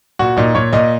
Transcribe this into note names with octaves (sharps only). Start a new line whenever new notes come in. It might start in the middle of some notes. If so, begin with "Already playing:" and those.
A#2 F#4
A#2 D#4
A#2 C#5
A#2 D#5